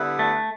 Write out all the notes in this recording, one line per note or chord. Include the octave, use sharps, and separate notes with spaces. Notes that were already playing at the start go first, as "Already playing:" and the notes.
Already playing: D3 G3 B3 E4
A3